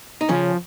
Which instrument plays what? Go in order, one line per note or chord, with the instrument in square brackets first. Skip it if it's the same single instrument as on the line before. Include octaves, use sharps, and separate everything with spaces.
[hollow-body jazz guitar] D#4
[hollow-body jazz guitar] C#3 C#4 [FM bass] F3